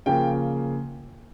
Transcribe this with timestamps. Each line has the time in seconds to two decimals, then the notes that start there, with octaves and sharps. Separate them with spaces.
0.06 C#3 F3 A#3 G5